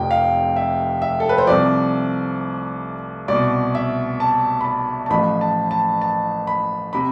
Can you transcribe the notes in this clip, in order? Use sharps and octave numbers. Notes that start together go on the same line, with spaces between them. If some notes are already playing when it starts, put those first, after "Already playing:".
Already playing: F1 F2 C3 G5
F5
E5
E5
A4
B4
C5
C2 C3 F3 D5
C2 B2 D5
E5
A5
B5
A5
A5
A1 A2 F3 B5
A5
A5
A5
B5
C3 B5